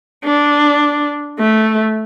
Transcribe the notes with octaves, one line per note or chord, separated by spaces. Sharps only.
D4
A3